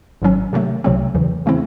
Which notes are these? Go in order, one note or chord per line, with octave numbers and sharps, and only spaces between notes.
G#1 G#2 F#3 C#4
C3 D#3 F#3 A3
C2 C3 F#3 A3 C4
E2 C#3 E3
C#3 E3 A3 C4 E4